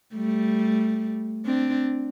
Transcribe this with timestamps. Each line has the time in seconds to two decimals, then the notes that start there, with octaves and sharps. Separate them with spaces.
0.15 G3 A3
1.45 C4 D4